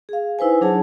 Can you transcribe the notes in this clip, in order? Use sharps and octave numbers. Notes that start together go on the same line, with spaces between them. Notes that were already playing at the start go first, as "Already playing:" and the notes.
G#4 F5
D#4 E4 B4 C5 G#5
F#3 D4 G#4 C#5 A5